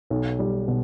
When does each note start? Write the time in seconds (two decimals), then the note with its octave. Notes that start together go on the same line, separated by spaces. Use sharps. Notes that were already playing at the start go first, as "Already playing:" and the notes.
0.10 B1
0.39 G3
0.68 B2